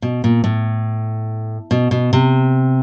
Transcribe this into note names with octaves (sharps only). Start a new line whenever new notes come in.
B2
A#2
A2
B2
B2
C3